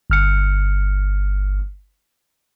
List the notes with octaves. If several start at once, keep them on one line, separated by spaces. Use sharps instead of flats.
G1 F6 C#7